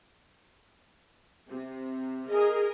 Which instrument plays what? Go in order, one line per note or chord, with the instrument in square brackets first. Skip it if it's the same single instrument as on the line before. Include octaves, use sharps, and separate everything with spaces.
[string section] C3
[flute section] G#4 [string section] A#4 D#5